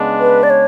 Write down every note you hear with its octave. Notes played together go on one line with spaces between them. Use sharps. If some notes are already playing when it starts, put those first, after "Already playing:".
Already playing: C#3 G#3 B3 D4
B4
D5
C#5